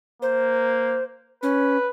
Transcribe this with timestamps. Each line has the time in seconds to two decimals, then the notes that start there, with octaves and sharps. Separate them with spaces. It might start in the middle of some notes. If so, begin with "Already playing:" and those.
0.22 A#3 C5
1.43 C#4 B4